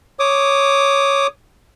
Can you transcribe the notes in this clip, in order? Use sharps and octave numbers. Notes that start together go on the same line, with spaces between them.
C#5 D6 D#6